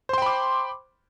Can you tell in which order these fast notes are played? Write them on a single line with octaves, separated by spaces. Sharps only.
C5 C6 G5 B5 D6